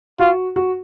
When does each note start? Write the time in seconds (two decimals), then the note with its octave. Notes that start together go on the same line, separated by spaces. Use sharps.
0.19 F4 F#4
0.56 F#4